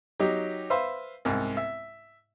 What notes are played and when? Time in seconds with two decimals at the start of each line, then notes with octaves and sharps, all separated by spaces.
0.20 F#3 D#4 G4
0.70 B4 C5 E5 F5
1.25 C2 G#2
1.57 E5